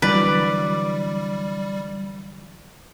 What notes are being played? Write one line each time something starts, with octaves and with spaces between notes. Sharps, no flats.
D3 E3 F#3 G3 B4 D5